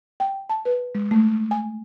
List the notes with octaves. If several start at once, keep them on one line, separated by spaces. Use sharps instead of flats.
G5
A5
B4
G#3
A3
G#5